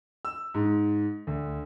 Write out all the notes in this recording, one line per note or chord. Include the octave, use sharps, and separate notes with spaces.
E6
G#2
D2